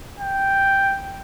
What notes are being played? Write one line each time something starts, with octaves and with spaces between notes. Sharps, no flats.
G5